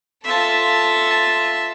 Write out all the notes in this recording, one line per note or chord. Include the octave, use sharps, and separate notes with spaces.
F4 A4 E5 A5